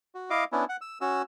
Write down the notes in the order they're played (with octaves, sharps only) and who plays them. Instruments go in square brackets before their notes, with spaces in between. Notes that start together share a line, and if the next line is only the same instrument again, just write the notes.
[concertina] F#4
E4 D#5 F5 D6
B3 C#4 D4 E4
F#5
E6
C#4 F#4 E6